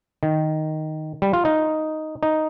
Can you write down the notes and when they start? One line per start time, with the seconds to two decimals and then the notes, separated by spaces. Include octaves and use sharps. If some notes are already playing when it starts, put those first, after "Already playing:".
0.23 D#3
1.22 G3
1.33 F4
1.45 D#4
2.23 D#4